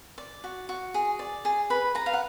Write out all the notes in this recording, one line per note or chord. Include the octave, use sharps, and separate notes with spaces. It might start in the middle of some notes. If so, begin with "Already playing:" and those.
D5
F#4
F#4
G#4
D5
G#4
B4 B5
B4 A#5
F5
F#5